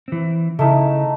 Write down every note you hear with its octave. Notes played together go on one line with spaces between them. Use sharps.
E3 C4
C#3 A3 D#4 E4